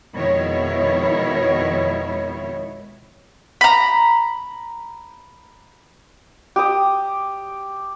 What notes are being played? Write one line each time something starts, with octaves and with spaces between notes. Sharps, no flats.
F2 B2 D#3 G#3 E4 C#5
A#5 B5
G4 D#6